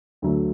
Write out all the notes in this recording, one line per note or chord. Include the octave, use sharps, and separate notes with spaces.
D2 D3 F#3 A3